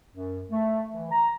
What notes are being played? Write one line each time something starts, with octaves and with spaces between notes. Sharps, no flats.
F#2
A3
E3
A#5